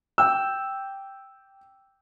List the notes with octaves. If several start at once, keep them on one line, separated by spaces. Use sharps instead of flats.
G5 E6